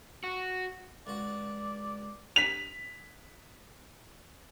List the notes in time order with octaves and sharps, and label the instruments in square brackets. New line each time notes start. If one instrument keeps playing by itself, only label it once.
[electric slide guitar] F#4
[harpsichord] C#2 F#4 [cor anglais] D5
[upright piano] B6 F7